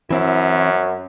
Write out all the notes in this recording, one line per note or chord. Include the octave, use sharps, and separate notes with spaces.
F#2 E3 C4 E4